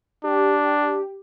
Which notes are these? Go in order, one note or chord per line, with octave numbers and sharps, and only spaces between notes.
D4 G4